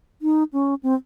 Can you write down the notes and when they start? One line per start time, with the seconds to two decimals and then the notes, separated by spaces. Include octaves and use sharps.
0.22 D#4
0.53 C#4
0.83 C4